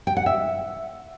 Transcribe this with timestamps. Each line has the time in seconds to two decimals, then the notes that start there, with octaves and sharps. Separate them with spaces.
0.07 G5
0.17 F#5
0.26 E5